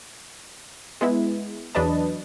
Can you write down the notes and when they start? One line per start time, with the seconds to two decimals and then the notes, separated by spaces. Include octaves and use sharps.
1.01 G#3 B3 E4
1.75 E2 F#3 D4 B4 D#5 A5